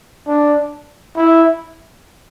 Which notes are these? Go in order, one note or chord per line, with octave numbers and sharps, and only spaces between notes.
D4
E4